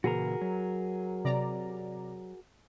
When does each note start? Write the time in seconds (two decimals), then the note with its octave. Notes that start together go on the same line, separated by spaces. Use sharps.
0.04 A#2 C#3 E3 F#4 G#4 A#4
0.41 F#3
1.25 C3 D5 A#5